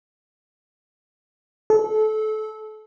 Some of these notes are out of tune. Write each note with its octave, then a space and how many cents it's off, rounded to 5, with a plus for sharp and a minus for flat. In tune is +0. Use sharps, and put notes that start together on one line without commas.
A4 -25